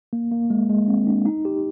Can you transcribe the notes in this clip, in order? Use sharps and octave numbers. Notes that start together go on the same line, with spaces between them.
A#3
A#3
G#3
G#3
C4
D4
D#4
G4